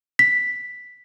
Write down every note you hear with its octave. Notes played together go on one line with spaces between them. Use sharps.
B6